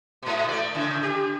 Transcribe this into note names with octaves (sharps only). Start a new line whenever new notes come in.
G#2 B2
A3 D5
A2 C#3
G4